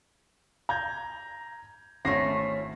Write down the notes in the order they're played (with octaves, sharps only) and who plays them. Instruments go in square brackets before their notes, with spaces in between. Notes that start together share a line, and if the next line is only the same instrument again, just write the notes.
[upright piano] A#5 G6 G#6
[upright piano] G#1 A#6 C7 [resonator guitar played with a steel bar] A3 C#4 E4